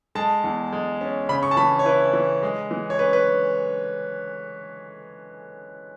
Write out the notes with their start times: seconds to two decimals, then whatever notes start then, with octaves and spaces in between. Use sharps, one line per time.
0.15 G#3 A5
0.44 E2
0.72 G#3
1.01 C#4
1.29 C#3 B5
1.43 C#6
1.51 A5
1.57 E3 B5
1.79 C#5
1.85 E4 B4
2.13 E3
2.43 G#3
2.71 E3
2.90 C#5
2.99 C#4 B4
3.13 B4